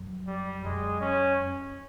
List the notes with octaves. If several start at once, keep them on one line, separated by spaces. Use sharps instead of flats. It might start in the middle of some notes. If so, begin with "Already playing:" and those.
Already playing: F#2
G3
F#2 G#3
C#4